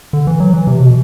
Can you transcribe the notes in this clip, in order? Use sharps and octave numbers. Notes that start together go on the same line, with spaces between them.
D3
E3
F#3
E3
C3
B2